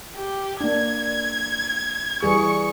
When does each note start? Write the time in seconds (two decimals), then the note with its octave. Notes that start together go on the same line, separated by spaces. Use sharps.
0.15 G4
0.61 A#3 D4 G#6
2.23 E3 G3 G#4 C#6